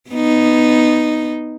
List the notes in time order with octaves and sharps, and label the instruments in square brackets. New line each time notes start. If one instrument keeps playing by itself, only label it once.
[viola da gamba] B3 D#4